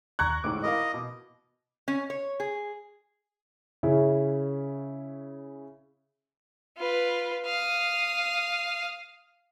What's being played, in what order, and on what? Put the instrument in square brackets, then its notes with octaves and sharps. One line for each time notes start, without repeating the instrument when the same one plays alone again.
[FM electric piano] D#2 A#5 G#6 [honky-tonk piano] C#6 F#6
[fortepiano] A1 D2 G#2 [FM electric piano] D6
[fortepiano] E4 A#4 F5 [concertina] D#5
[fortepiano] B2
[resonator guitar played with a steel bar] C#4
C#5
G#4
[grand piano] C#3 C#4 E4
[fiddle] F4 B4
F5 D#6